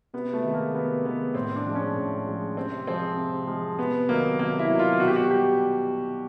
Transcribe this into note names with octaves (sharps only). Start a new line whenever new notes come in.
C3 B3
A3
D#3 G#3
A#3
C3 B3
D#3 G#3 B3
A2 C4
D4
F3 G#3
C#4
A2
F3 G#3
C3 C4
F3 G#3 C4
C3
F3 G#3
C3 B3
D#3 F#3 A#3
C3 A#3
E4
D#3 F#3
F4
B2 F#4
G4
F#4
G3 G4